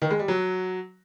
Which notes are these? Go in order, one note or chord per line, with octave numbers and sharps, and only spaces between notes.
D#3
G#3
G3
F#3